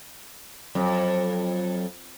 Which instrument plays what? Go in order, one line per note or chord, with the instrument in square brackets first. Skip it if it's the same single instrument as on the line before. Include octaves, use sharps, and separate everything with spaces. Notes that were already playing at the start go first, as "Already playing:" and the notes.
[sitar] F2 [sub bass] F#3